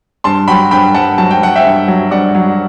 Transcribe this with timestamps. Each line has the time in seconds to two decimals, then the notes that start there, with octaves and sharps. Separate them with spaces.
0.24 G2 A5 C6
0.48 F#3 G5 B5
0.71 G2 G5 B5
0.94 G2 F#5 A5
1.18 F#3 A5
1.31 G5
1.41 F#3 F#5
1.56 E5 G5
1.65 G2
1.88 F#3
2.11 G2 D5 F#5
2.35 F#3